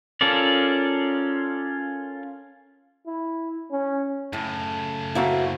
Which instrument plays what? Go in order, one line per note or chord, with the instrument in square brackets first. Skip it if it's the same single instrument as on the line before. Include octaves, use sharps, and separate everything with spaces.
[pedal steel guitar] C#4 F4 A4 A#4 D5
[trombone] E4
C#4
[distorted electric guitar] F#2 C#3 [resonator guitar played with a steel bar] A2
[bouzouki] A#3 C4 [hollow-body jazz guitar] E4 F#4